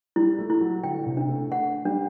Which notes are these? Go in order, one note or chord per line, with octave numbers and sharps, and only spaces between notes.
G3 E4
A3
E4
F#3
D3 G5
C3
D4
A3
A3 F#5
G3 D4